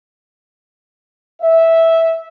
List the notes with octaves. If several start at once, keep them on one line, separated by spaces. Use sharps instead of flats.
E5